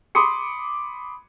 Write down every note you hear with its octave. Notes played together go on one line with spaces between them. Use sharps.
B5 C6 D6 D#6 C#7